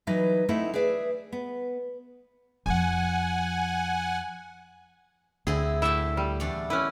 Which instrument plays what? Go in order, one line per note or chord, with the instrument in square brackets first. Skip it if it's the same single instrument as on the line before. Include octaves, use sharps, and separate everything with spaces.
[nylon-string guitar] E3 F#3 D#4 B4
A3 C4 D#4 E4 A4 F#5
G#4 B4 D5 E5
B3
[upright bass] F2 F3 [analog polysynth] F#5 G#5
[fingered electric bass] D2 [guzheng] D3 C4 E4 [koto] G#4
[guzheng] A2 G5 A5 [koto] E4 E5
[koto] G3
[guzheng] E2 A3 D4
[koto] C#4 E4 [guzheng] B4